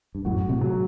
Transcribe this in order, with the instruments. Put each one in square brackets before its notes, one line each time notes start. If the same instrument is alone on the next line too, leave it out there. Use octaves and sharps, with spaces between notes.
[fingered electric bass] G2
[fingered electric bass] F#2 A2 [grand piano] F#4
[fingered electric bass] A2 C3
[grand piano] F#3